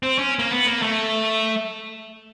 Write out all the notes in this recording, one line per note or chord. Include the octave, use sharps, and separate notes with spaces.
C4
C#4
A#3
B3
A#3
A3